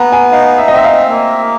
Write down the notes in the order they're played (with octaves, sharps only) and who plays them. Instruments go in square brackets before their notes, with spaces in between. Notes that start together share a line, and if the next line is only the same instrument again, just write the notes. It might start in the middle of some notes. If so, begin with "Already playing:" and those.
Already playing: [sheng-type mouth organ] B3 [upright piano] A#5
[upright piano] G#5
[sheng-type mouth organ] D#4 [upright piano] F5
[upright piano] E5
D#5
[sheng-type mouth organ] C4 [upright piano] E5
[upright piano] F5
[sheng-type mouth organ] A#3